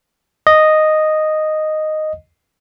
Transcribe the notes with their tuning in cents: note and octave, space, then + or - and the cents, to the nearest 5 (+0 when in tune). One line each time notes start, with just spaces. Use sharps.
D#5 -5